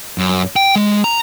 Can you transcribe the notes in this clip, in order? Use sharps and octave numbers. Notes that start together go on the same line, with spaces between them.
F#2
G5
G#3
A#5